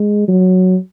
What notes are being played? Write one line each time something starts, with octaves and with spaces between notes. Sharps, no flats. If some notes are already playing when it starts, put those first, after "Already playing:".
Already playing: G#3
F#3